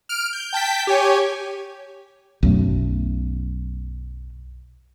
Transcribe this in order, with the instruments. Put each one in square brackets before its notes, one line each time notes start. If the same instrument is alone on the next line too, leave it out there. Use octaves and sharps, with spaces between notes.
[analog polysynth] F6 D7
G6
G5 A5 G6 B6
G4 C#5 G#5
[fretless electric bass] B1 F#2 A3